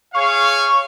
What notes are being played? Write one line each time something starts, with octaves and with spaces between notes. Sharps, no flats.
G#4 C#5 F5 C#6